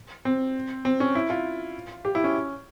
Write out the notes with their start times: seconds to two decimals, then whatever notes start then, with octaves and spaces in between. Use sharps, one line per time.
0.25 C4
0.85 C4
1.00 C#4
1.15 E4
1.30 F4
2.05 G4
2.15 E4
2.24 C#4